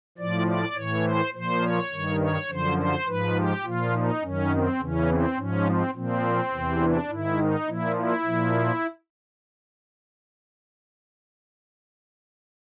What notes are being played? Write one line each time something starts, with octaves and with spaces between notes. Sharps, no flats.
A2 F3 D5
D5
A2 E3 C#5
C5
A#2 F3 C5
C#5
G2 D#3
C#5
F#2 D3 F3 C5
C5
G#2 F3 B4
G4
A#2 F3 F4
D#4
F#2 D#3 C#4
C4
E2 C#3 E3 C#4
C4
G#2 F3 C#4
C4
A#2 F3 C4
E2 C3 E3
D4
G#2 D#3 E4
D#4
A#2 F3 E4
E4
A#2 F3